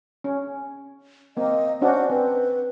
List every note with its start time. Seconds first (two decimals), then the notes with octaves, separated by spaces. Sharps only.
0.24 C#4
1.37 A#3 C4 D#5
1.81 C#4 D4 F#4 C5
2.10 C4 B4